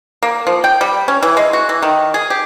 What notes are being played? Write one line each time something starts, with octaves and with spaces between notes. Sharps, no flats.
A#3
F3
G5
G3
C#4
E3
G#3
F#4
E3
D#3
G#4
G4